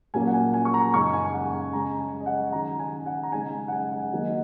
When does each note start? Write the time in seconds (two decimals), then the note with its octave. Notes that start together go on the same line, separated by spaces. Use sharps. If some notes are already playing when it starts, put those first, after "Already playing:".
0.14 A#2 F#3 A#3 C#4 G#5
0.27 F#5
0.34 G#5
0.54 G#5
0.65 C#6
0.74 A#5
0.93 F#2 C#3 G#3 D#4 C#6
1.13 G#5
1.25 G#5
1.34 F#5
1.53 G#5
1.73 C#3 G#3 C#4 A#5
2.00 G#5
2.20 D#5
2.26 F#5
2.53 D#3 F#3 C#4 A#5
2.79 G#5
3.06 F#5
3.23 A#5
3.32 C#3 G#3 D#4 G#5
3.68 F#5
3.72 G#5
3.92 F#5
4.12 D#3 F#3 A#3 D#4